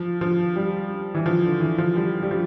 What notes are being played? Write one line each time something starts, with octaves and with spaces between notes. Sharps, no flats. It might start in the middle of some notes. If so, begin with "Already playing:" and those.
Already playing: F3
F3
G3
E3
F3
D3
E3
F3
G3
G3
F3